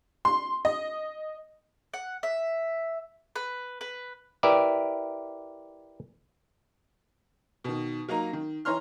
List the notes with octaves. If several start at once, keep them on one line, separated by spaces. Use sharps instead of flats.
C6
D#5
F#5
E5
B4
B4
E4 G4 A#4 B4 D5 E5
B2 D#3
F#3 A#3 D#4 A#5
D#3
E3 C#5 A#5 C6 F6